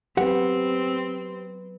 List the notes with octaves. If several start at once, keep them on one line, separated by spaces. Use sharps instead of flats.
F#3 C4 G4 B4 F#5